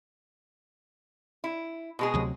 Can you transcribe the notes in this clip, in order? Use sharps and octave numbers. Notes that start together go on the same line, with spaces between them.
E4
B2 G#3 G#4
D2 C3 F#3